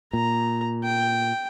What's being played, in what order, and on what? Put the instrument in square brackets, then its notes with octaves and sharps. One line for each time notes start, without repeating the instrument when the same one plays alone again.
[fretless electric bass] A#2 [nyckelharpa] A#5
[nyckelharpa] G5